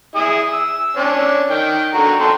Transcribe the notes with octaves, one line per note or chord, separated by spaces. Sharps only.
E4 G#4 D#6
E6
C#4 D4
D#3 G5
D3 F#4 A#5
A4 G5 C6